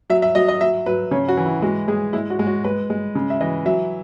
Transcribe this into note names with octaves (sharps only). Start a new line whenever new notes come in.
F#3 E5
E5
F#3 D#5
D#5
F#3 E5
F#3 B4
C#3 C#5
F#4
E3
E4
G#3 F#4
G#3 G#4
G#3 E4
F#4
G#3
F#4
G#3 B4
G#3
C#3
E5
E3 D#5
F#3 E5